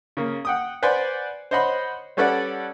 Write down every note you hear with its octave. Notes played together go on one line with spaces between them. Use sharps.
C#3 A#3
F#5 G5 D#6
B4 C5 D5 F#5 G#5 C6
C5 C#5 D#5 F#5 B5 C6
G3 C#4 A4 B4 D5 F#5